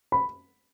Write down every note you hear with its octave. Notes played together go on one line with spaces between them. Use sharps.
B5